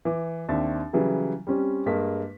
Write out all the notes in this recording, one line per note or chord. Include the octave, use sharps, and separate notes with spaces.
E3 D6
D#2 C4 D4 E5 A6
C#3 E3 F#3 G3
G3 C4 C#4 G4
G2 G#3 A#3 B6